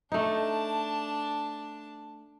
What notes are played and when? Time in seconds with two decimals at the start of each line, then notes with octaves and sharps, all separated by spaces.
0.12 A3 D4 D#4 A5